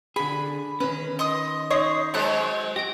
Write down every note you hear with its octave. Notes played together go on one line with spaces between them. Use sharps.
D3 G#4 B5
D#3 C#4 B4
D#5 C6 D#6
D#4 C#5 D#5 C6
F#3 G#3 C4 C5 F#6
G4 A#6 D7